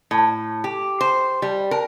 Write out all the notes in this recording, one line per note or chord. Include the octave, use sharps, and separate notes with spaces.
A2
G4
C5
G3
A#4